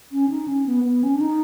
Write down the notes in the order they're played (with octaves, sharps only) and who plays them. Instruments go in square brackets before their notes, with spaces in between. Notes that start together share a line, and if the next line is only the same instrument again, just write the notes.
[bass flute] C#4
D#4
C#4
B3
B3
C#4
D4
D#4